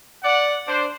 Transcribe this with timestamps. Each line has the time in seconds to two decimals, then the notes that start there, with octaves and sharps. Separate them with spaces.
0.23 D5 F#5
0.66 D4 C5